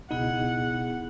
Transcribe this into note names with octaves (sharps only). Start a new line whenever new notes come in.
C#2 B2 B3 D#4 E4 G#4 F#5